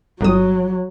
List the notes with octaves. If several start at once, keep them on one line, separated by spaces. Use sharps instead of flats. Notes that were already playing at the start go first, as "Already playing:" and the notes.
G1 F#3 D#6